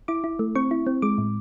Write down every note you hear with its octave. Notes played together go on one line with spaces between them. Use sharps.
E4 D6
E4
A3
C4 C#6
E4
C4
G#3 D6
A2